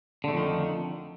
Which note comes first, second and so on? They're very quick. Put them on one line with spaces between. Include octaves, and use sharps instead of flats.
D3 A3 F2 D#3